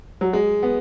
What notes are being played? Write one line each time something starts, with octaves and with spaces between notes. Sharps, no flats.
F#3
G#3
B3